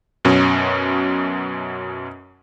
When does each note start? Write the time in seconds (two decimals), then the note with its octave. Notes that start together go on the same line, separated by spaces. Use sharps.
0.25 F#2 B2 C#4